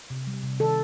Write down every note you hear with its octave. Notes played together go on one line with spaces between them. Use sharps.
C3
G3
C3
D#3 A4